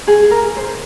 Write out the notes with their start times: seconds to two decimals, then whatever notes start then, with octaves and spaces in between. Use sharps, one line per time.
0.07 G#4
0.31 A#4
0.57 C5